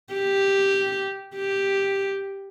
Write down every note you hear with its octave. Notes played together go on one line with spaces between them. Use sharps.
G4
G4